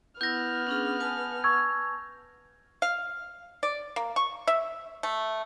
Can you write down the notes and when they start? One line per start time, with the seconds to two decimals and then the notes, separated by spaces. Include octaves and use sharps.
0.21 B3 E4 E6 F6 G6 A#6
0.67 C#4 D4 G#4
1.00 B4 G#5 A5
1.44 C#6 E6 G#6
2.82 F5
3.63 D5
3.96 A#3
4.16 C#6
4.48 E5
5.03 A3